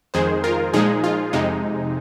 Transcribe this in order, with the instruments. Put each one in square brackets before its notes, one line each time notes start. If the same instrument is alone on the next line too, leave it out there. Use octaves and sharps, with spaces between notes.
[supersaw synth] F2 D#3 G#3 G#4 C5
F4 A#4
A#2 F3 G#3 D#4 G#4
F4
F2 C3 G#3 D#4